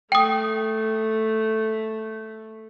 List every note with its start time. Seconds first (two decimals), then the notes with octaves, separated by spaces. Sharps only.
0.12 A3 G5 D#6